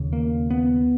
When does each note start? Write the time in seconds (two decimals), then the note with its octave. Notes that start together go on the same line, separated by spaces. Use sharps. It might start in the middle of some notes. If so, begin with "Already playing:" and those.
Already playing: D#2 C#3
0.13 A#3
0.50 B3